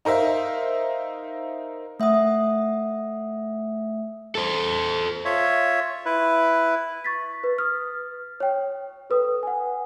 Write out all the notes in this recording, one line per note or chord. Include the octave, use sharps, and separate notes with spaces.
D#4 A#4 C5 E5 F5
A3 E5 F#5 D#6
A4 C5
F4 C#5 E5
E4 B4
C#6 A6 B6
B4
D#6 F6
C#5 G5
A4 B4 D#6
F#5 G#5